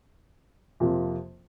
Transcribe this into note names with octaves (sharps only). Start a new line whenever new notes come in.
F2 C3 F3 A#3 F4